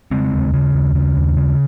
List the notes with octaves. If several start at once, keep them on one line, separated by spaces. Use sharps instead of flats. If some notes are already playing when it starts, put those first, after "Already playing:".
C#3 G#3 C4
D#2
C#3
D#2
C#3
D#2
C#3